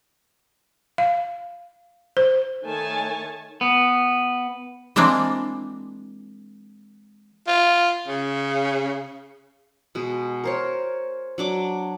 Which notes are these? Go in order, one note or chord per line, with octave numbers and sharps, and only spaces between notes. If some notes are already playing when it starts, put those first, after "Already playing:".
F5
C5
D#3 A3 C#5 G#5 A5
B3
E3 G#3 A#3 C4 D4
F4
C#3
B2 G#3
A#4 C5 C#5
F#3 D4 D6